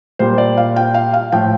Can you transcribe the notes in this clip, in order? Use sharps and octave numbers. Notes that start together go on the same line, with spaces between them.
A#2 G3 C5
D5
F5
G5
F5
F5
A2 F3 G5